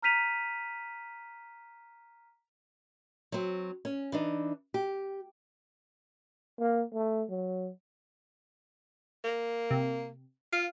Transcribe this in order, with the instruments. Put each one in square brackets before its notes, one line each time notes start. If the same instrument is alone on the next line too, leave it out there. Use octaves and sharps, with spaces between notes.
[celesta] A#5 F6 G6 B6 D#7 F7
[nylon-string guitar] F#3 C4
C#4
E3 D4 D#4
G4
[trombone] A#3
A3
F#3
[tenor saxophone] A#3
[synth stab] C3
[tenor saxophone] F4 [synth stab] F5